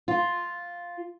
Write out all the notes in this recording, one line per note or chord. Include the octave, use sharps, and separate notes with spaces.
F4